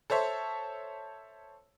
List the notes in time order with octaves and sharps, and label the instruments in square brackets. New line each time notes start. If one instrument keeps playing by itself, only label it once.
[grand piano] A4 C5 C#5 E5